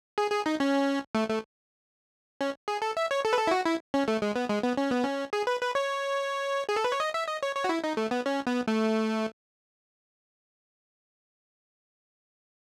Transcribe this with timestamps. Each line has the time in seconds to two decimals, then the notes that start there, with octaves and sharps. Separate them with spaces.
0.18 G#4
0.31 G#4
0.46 D#4
0.60 C#4
1.15 A3
1.29 A3
2.41 C#4
2.68 G#4
2.82 A4
2.97 E5
3.11 C#5
3.25 A4
3.33 B4
3.38 A4
3.47 E4
3.51 F#4
3.66 E4
3.94 C#4
4.08 A3
4.22 G#3
4.36 B3
4.49 G#3
4.63 B3
4.77 C#4
4.91 B3
5.04 C#4
5.33 G#4
5.47 B4
5.61 B4
5.75 C#5
6.69 G#4
6.76 A4
6.84 B4
6.92 C#5
7.00 D#5
7.14 E5
7.28 D#5
7.43 C#5
7.55 C#5
7.64 F#4
7.69 E4
7.84 D#4
7.97 A3
8.11 B3
8.26 C#4
8.47 B3
8.68 A3